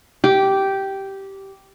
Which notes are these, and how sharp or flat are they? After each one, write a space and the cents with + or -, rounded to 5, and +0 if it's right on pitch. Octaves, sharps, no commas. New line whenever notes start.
G4 -10